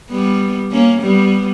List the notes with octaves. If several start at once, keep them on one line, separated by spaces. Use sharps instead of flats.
G3 B3
A#3 C#4
G3 B3